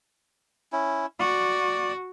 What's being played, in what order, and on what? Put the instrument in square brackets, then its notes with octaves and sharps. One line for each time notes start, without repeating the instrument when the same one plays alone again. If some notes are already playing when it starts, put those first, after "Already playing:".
[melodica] C#4 E4
[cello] F#4 [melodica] D5